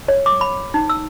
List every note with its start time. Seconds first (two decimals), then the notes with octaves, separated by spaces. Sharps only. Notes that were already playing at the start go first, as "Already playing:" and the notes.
0.08 C#5
0.26 D6
0.41 B5
0.74 D#4
0.90 E6